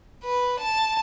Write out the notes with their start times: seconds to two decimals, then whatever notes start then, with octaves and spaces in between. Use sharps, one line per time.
0.24 B4
0.59 A5